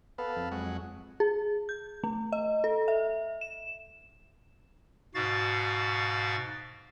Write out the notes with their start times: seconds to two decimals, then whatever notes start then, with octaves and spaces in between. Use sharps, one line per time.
0.18 B3 A4 B4 F5
0.36 F2
0.52 F#3 G#3 F#5
1.20 G#4
1.69 G6
2.04 A3
2.32 D#5
2.64 A4
2.88 E5
3.41 E7
5.15 G#2 B2 F#4 F5 A6